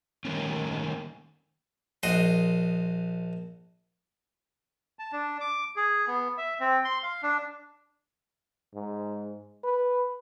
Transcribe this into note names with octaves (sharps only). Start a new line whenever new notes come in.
D#3 G3 A3 A#3 C#4
A#1 F#4 D#5 C6
A5
D4
D6
G#4
B3
E5
C4
C6
F5
D4
G#2
B4